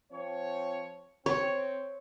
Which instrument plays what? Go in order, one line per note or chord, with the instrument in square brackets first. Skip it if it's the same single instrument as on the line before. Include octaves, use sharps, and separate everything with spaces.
[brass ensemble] F3 C4 C#5
[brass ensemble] C4 [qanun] C#5